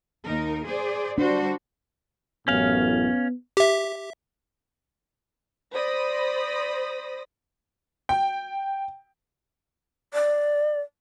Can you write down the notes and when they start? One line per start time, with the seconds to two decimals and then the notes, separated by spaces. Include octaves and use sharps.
0.24 D#2 D#4 A#4
0.66 G#4 C5 D5
1.18 G3 D4 F#4 C5
2.48 A1 F#2 A2 B3 C#4 F5
3.57 G4 E5
5.72 C5 D5 B5 D#6 A#6
8.09 G5
10.14 D5